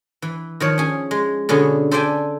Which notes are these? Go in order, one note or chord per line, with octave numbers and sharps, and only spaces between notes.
E3
D#3 F3 C#5
C#4 G#4
G#3
B2 D3 C#4 G#4
A4 C5 D5 E5 G5 G#5